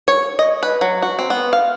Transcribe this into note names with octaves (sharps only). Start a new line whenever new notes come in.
C#5
D#5
B4
F#3
F#4
C4
B3
F5